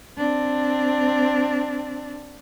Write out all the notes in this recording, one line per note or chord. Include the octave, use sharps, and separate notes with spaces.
C4 D4